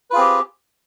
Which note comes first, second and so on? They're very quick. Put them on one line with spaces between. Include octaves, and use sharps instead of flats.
B4 F4 G#4 C4 G4